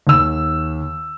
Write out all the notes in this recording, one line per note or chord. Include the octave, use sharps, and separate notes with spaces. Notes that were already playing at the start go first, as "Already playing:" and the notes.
D#2 E6